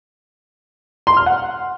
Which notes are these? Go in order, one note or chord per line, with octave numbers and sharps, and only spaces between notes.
C6
F6
F#5